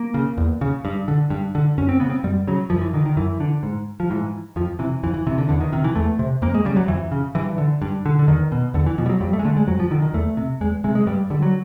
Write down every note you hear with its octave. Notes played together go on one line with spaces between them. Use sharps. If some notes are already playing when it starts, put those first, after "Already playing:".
Already playing: A#3
C#3
E2
C#3
G2
D3
G2
D3
F#2 C#4
C4
C#3 B3
C4
F#2 G3
C#3 F#3
F#2 F3
E3
D3 D#3
D#3
F#2 E3
D3
G#2
F3
G#2 E3
F2 F3
C3 E3
F2 E3
E3
C3 E3
D3
E2 D3
D#3
C3 D#3
E3
E2 A3
C3
F2 A#3
G#3
C#3 G3
F#3
F2 E3
C#3
G2 E3
D3
G2
D3
D3
E2 D#3
B2
E2 D3
E3
B2 F3
G3
F#3
F2 G3
A3
G#3
D3 A3
G#3
F2 F#3
F3
D3 D#3
D#3
E2 A3
C3
E2 G#3
C3 G#3
G#3
G2 G3
D3 G3
F#3